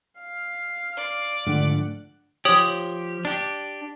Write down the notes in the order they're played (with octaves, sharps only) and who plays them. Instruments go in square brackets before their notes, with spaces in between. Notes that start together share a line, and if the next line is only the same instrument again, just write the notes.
[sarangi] F5
[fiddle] D5
[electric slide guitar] G#2 F3 A3 [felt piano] D3 [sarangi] F#5
[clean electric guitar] F3 G4 [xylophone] C#5 D#6 F#7
[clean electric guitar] D4 G4